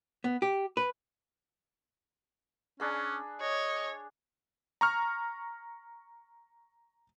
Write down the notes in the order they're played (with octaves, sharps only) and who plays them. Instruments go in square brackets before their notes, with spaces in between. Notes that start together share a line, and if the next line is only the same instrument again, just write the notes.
[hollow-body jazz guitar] B3
G4
B4
[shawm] C#4 [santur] D4 G#4 B5
[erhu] C#5 [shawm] D#5
[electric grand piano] A#5 C#6 F6